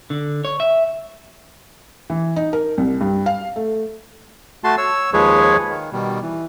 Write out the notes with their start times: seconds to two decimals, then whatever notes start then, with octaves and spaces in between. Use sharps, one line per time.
0.10 D3
0.45 C#5
0.60 E5
2.10 E3
2.36 D#4
2.53 A#4
2.78 C2
3.01 G2
3.26 F5
3.56 A3
4.64 A3 F#4 A5 C6
4.78 C#5 E6
5.13 D#2 F3 G#3 G#4 B4 C#5
5.69 D#3
5.93 B2 D#3 G3
6.22 E3